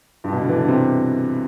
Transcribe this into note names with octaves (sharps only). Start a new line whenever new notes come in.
G2
B2
D3
E3
D3
C3